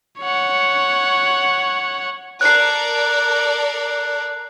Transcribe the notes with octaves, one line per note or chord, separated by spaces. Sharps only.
C#5 F#5
A4 A#4 D5 F#6 C7